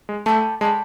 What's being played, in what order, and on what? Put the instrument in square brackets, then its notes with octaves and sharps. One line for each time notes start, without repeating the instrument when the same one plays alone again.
[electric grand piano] G#3
[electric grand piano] A3 [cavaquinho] A4 D5 G5 B5
[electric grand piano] G#3 [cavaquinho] A4 D5 G5 B5